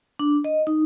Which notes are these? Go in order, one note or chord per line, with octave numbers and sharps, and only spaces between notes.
D4
D#5
D#4